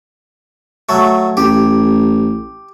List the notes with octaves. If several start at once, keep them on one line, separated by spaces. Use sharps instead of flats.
F#3 A3
A1 G4